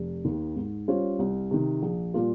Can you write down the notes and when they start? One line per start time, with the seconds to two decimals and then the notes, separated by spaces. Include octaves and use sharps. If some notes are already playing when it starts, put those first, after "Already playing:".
Already playing: F1
0.25 D#2 D#3
0.56 G#2
0.88 G3 C#4 F4 C5
1.19 C2
1.51 C3 D#3
1.82 A#1
2.14 A#2 G3 A#3 F4